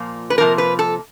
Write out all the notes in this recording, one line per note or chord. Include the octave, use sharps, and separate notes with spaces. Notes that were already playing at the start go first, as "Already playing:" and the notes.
Already playing: A#2 F3 A#3
B4
C3 F3 A#3 A#4
B4
A4